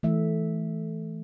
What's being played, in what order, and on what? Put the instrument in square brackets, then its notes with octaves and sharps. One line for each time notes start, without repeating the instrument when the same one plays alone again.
[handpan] E3 A3 E5